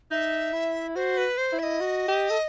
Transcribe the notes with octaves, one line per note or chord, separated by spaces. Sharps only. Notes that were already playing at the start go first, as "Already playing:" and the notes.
D#4 E5
E4
F#4 C5
B4
C5
E4
E5
D#5
F#4
G4
A4